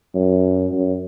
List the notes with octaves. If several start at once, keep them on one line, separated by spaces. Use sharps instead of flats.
F#2
F#2